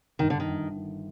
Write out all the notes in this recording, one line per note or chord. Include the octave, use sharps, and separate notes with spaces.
G1 D#3
D3
D#3
G1
D#3